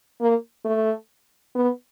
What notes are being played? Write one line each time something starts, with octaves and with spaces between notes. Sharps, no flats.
A#3
A3
B3